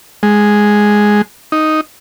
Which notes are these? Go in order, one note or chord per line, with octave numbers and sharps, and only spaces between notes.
G#3
D#4